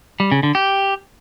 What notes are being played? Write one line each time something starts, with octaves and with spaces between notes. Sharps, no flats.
G3
C#3
D3
G4